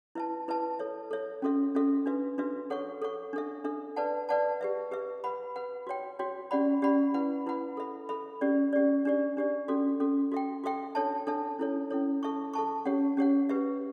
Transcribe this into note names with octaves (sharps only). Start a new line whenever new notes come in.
E4 B4 E5 A5
E4 B4 E5 A5
A4 C#5 E5
A4 C#5 E5
C#4 F#4 A4 E5
C#4 F#4 A4 E5
D4 F#4 B4 E5
D4 F#4 B4 E5
A4 C#5 F#5 C#6
A4 C#5 F#5 C#6
D4 A4 E5
D4 A4 E5
B4 D5 F#5 A5
B4 D5 F#5 A5
G4 B4 E5
G4 B4 E5
B4 F#5 B5
B4 F#5 B5
F#4 C#5 G5
F#4 C#5 G5
C#4 G4 D5 F#5 B5
C#4 G4 D5 F#5 B5
E4 B4 F#5 B5
E4 B4 F#5 B5
A4 E5 B5
A4 E5 B5
C#4 G4 D5
C#4 G4 D5
D4 G4 D5
D4 G4 D5
C#4 F#4 A4
C#4 F#4 A4
F#4 A4 E5 G5
F#4 A4 E5 G5
D4 A4 C#5 E5 A5
D4 A4 C#5 E5 A5
C#4 E4 A4 C#5
C#4 E4 A4 C#5
A4 E5 A5 C#6
A4 E5 A5 C#6
C#4 G4 C#5 F#5
C#4 G4 C#5 F#5
G4 B4 E5